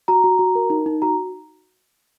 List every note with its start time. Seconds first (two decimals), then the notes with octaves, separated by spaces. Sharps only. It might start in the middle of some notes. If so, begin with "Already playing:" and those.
0.08 F#4 A#5
0.24 F#4
0.39 F#4
0.55 A#4
0.70 D#4
0.86 D#4
1.02 F#4 A#5